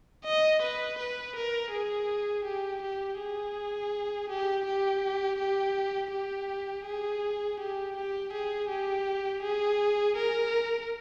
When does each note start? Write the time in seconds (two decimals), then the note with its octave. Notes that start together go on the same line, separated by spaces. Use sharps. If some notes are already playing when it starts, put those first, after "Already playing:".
0.24 D#5
0.61 B4
0.98 B4
1.35 A#4
1.71 G#4
2.44 G4
2.82 G4
3.18 G#4
4.29 G4
4.65 G4
5.39 G4
6.12 G4
6.86 G#4
7.60 G4
7.96 G4
8.32 G#4
8.69 G4
9.42 G#4
10.16 A#4